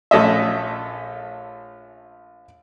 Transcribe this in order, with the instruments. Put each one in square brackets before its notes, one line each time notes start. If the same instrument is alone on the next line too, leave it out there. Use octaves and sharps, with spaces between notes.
[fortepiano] A#1 A3 C#4 D#5 E5